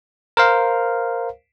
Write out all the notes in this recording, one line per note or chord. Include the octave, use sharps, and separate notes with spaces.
A#4 C5 F5